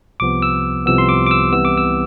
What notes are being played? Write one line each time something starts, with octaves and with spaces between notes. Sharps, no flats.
C2 C3 F3 B3 D6
E6
C2 C3 F3 B3 E6
C6
D6
D6
E6
C2 C3 E3 B3 E6
D6
E6